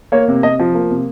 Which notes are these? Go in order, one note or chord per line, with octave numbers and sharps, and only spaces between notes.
A#3 C#5
C3
C3 D#5
F3
A#3
C3